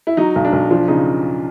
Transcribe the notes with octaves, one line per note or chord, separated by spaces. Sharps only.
E4
F#3 D#4
B1
D4
B1
F3 D4
C#3 D#4